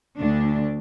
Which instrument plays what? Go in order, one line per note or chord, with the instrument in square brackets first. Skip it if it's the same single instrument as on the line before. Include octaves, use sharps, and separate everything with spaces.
[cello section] D2 D3 D4